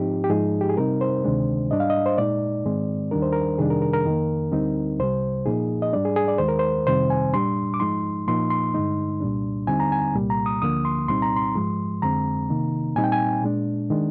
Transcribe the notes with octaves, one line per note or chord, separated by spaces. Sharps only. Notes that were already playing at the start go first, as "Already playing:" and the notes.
Already playing: G#2 F3 C4 D#4 G4
G4
G#2 F3 G#3 D#4 G#4
G4
G#4
C3 G3 C4 D#4 A#4
C5
D2 C3 D#3 G#3 D4
G#2 G3 D4 D#5
F5
D#5
C5
A#2 G#3 D#4 D5
G#2 D#3 G#3 C4
D#2 D#3 G3 D4 A#4
C5
A#4
F2 C3 D#3 G3 D4 G#4
A#4
A#4
A#4
F2 D#3 A#3
D2 D3 G3 C4 D#4
C2 C3 G3 C5
A#2 F3 A#3 D#4 G#4
D#5
G#2 G3 D4 D5
G#4
G#4
D5
D#2 D#3 G#3 C5
A#4
C5
F2 C3 D#3 G3 C4 C5
G#5
A#2 G3 D4 C6
D6
G#2 F3 G#3 D#4 C6
A#2 F3 A#3 D#4 C6
C6
G2 D3 G#3 D#4
C2 A#2 G3 D4
D#2 D3 G3 C4 D#4 G#5
A#5
G#5
C2 A#2 G3 A#3
A#5
D#6
D2 D3 F3 A#3 D#6
C6
C2 A#2 G3 C4 D#4 C6
A#5
C6
G#2 F3 G#3
F2 D3 G#3 C4 A#5
C3 D#3 A#3 D#4
A#2 G3 C4 D#4 G#5
G5
G#5
A#2 G#3 D4
D#3 G#3 D4